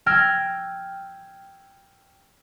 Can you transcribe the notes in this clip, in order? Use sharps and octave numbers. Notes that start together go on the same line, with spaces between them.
G5 E6 F6 G#6 A#6